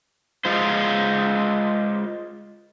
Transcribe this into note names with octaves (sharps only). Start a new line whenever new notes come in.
G#3 F4 C5